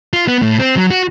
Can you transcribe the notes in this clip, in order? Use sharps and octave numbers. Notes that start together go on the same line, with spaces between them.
F4
B3
A2
C4
F#3
F#4